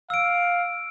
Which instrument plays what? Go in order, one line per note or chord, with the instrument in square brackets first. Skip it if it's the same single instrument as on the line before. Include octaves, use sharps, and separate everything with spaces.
[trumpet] F5 [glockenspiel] E6 D7